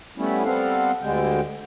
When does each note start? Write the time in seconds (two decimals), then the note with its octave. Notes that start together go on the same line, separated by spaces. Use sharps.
0.18 G3 A3 B3 C#4 E4
0.44 G3 B3 C4 A4 F5 F#5
1.02 D2 D3 G3 G#3 G5